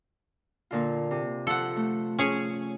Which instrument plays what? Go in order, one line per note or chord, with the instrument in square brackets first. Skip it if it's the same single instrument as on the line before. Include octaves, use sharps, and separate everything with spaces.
[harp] A#2 D3 F4
C3
[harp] F3 [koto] A4 F#5
[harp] A3
[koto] C#4 G#4 C#5